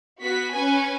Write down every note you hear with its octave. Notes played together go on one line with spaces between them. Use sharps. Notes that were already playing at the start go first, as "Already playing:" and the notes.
B3 F#4 B6
C#4 B4 G#5